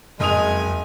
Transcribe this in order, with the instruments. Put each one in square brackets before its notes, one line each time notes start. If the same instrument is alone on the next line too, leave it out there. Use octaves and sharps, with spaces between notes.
[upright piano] F#1 D#6 F7 [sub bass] F2 [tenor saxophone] G#3 [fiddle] G#5